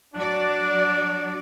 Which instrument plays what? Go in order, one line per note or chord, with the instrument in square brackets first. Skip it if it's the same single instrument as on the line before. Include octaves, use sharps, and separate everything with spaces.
[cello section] F#3 F#4 D5 [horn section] D4